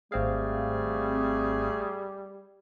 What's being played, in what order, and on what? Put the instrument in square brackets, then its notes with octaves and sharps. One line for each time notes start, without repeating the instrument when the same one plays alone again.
[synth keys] G#1 C4 F5 [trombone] G3 [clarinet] A3 [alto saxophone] G#4